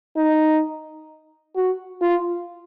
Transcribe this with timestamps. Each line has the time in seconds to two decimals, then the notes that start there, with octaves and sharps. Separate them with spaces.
0.16 D#4
1.56 F#4
2.02 F4